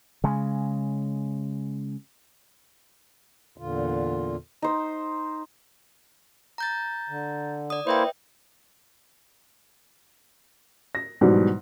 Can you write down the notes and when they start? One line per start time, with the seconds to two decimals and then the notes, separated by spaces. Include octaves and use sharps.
0.24 C#3 G#3
3.58 E2 A#2 D3 F4
4.62 D#4 C5
6.58 A#5 G6 A6
7.09 D3
7.70 D5 D#6
7.87 A#3 E4 B4 C5 E5 G5
10.95 A#6
11.21 G#2 B2 E3 F#3 G3